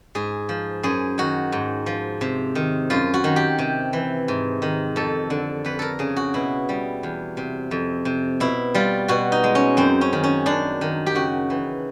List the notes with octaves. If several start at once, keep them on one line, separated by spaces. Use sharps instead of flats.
G#2 G#4
F3
F#2 G#4
D#3 F#4
G#2
F3
C3
D#3
F#2 F4
F#4
D#3
G4
C3
E3
G#2
D#3
F2 A4
D3
F2 B4
A4 A#4
C#3 G#4
F#4
B2 E4
G3
E2
C3
F2
C3
B2 E4
G3 F4
B2 F#4
D#4
G#3
C#4
F#2 C4
C#4
D#3
C#4
F#2 D4
D#3
G4
C#3 F#4
E3